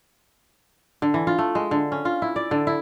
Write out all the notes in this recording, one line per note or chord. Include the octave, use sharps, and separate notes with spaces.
D3
E3
F4
A3
G#3
D3
C#4
F4
E4
D5
D3
E4